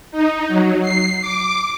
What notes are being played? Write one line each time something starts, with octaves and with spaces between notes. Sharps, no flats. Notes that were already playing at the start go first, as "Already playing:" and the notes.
D#4
F#3
C7
D6